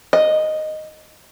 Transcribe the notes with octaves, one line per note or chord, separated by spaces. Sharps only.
D#5